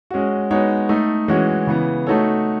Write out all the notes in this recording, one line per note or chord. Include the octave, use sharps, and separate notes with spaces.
G#3 C#4 F#4
G#3 B3 D#4 F#4 C#5
A3 D#4 A4
E3 G#3 C#4 F#4 C#5
C#3 E3 B3
A3 D#4 F#4 A4 C#5